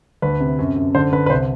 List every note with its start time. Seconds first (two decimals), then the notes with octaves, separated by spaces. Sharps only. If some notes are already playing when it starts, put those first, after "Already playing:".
0.22 D2 B4
0.40 C3
0.59 F#2
0.76 F#2
0.95 D3 C5
1.12 D3 B4
1.26 B4
1.30 C2 C5